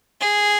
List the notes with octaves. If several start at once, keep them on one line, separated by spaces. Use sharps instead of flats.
G#4